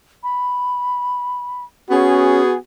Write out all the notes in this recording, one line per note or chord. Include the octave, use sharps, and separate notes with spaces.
B5
B3 C#4 F#4 G#4